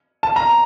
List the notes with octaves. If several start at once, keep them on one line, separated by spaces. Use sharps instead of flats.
A5
A#5